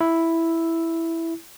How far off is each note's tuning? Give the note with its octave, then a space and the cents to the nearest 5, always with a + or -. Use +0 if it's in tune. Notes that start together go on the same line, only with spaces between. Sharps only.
E4 +0 E6 +0